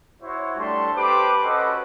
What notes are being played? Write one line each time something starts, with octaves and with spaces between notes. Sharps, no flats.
E4 F#4 C5 C#5
G3 A3 D4 A5 C6
G4 B4 C5 A5 D6
C#4 F#4 A4 B4 C5 D#5